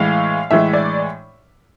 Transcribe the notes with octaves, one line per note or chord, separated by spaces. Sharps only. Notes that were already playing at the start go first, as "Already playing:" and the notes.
Already playing: A2 E3 G#3 F5
A2 E3 G#3 E5
D5